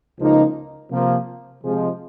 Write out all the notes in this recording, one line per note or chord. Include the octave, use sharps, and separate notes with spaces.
C#2 C#3 F3 A#3 D#4
C3 F3 A#3
C3 F3 G#3